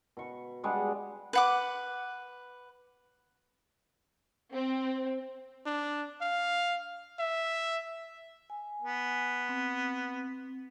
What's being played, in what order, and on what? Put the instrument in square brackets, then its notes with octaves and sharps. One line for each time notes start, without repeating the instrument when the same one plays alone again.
[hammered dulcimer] B2 C#6
G3 G#3 D4 F#5
[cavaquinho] B4 F#5 D6
[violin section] C4
[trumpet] D4
F5
E5
[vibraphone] G#5
[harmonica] B3
[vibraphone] C4